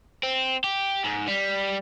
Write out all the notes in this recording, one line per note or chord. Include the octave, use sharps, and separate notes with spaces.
C4
G4
G#2
G3